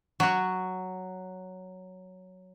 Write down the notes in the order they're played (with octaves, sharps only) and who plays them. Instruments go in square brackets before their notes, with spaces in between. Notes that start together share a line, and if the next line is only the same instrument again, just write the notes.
[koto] F#3 F#4